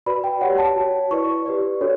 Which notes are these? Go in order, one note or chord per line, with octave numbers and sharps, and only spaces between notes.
F#4 B4 D5 B5
G5
G4 C#5 F#5
A5
F#4 C#5
E4 B4 D5 C#6
G4 B4 D5
D4 F#4 A4 C#5